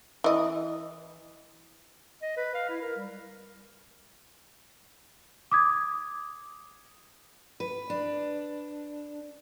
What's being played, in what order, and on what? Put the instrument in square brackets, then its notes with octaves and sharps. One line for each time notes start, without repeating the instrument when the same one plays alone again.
[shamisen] E3 D#5
[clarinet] D#5
B4
F5
E4
A#4
G3
[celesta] D6 D#6 G#6
[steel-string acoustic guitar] B4
D4